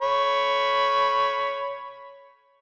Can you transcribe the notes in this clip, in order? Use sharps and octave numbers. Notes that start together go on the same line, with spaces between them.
C#5 B5